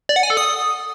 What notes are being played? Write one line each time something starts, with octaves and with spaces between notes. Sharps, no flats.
D5
F#5
G#5
A4
D#6